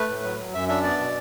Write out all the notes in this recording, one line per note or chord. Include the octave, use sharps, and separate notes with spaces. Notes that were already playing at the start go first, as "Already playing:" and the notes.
Already playing: A3 B4
A2
F#3
F#3
F#2 E5
D4 E5
B3 D5
B2